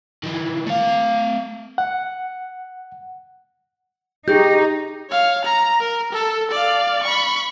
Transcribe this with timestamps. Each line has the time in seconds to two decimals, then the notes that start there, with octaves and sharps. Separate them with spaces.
0.23 D#3 E3
0.67 A3 F5
1.78 F#5
4.28 D#4 G4 G#4 G6
5.10 C#5 F5
5.45 A#5
5.80 A#4
6.13 A4
6.51 D5 F5
7.03 B5 C#6